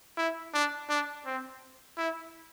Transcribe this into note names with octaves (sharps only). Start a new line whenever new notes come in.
E4
D4
D4
C4
E4